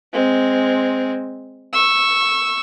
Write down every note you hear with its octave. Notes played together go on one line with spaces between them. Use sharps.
G#3 C4
C#6 E6